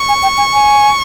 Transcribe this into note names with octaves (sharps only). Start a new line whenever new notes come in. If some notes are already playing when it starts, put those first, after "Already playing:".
Already playing: C#6
G#5
G5
G#5
G#5